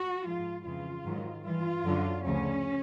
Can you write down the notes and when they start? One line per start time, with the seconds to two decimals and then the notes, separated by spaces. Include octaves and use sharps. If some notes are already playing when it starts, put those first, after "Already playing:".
Already playing: F#4
0.23 G#2 F3 F4
0.64 F2 C#3 E3 F4
1.04 G#2 D#3 F#3
1.43 G2 E3 F4
1.83 F#2 D3 F#3
2.23 D2 C#3 F3 C#4